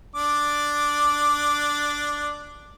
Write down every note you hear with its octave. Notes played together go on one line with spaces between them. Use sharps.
D4 D6